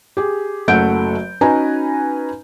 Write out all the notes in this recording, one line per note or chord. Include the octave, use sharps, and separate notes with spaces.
G4 G#4
F#1 F#3 A3 F#5 G6 D7
C#4 D#4 F#4 B4 G#5 A#5